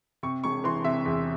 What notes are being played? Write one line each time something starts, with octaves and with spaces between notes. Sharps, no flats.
C3 C#6
E1 C#6
E3 C6
C3 E5
E2